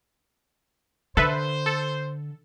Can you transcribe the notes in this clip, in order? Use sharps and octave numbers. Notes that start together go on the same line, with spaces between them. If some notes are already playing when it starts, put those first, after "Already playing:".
D3 A4 B4 C5 E5
A4